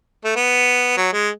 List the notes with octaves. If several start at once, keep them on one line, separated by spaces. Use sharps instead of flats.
A3
B3
F#3
G#3